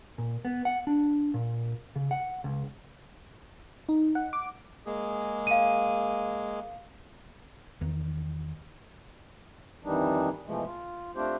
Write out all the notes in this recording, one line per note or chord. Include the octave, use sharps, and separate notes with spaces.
A#2
B3
F#5
D4
A#2
C#3
F#5
C#2
D#4
F#5
D6
G#3 A#3 G#4
F5 D#7
E2 D#3
F2 D#3 E3 G3 D4 D#4
B2 E3 F3 G#3 A3
F4
A3 C4 D4 F4 G4 C5